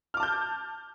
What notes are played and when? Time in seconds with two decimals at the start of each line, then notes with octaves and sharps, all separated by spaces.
0.14 F6
0.17 D6
0.20 A5
0.23 G6